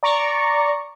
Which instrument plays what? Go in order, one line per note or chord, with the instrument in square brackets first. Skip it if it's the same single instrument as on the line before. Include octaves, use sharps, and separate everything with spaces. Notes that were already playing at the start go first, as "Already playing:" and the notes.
[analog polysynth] D5 A#5 C#6